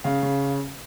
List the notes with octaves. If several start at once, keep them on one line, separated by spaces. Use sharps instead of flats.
C#3 F5
C#3